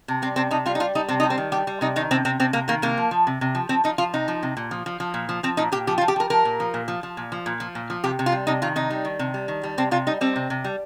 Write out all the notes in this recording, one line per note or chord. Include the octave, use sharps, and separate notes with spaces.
C3
G3 C4
C3 C4
C3 D#4
G3 F4
D#4
G3 F4
G3 D#4
C3 C4
D#4
G3
C4
D#3
G3 G4
G3
C3 D#4
D#3 D#4
C3 C4
C3 C4
C3 C4
C3 A#3
D#3 A#3
C3 A#3
F3
F3
C3
C3
F3
F3 C4
F3 D#4
F3 F4
C3 D#4
F3
C3
A#2
F3
F3
F3
A#2
F3
F3 C4
A#2 D#4
A#2 G4
F3 G4
F4
F3
G4
F3 A#4
F3 A#4
A#2
F3
A#2
F3
F3
A#2
F3
A#2
F3
A#2
F3
C3 G4
C3
F4
G3
C3 D#4
D#3 F4
C3 D#4
G3
D#3
C3
G3
D#3
G3
C3 C4
C3 F4
G3 D#4
G3 C4
C3
C3
G3